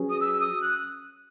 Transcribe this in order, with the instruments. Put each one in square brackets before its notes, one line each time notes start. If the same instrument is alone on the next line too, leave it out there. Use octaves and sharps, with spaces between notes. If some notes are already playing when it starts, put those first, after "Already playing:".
Already playing: [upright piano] F#3 C#4 G#4 B4
[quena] D#6
E6
D#6
F#6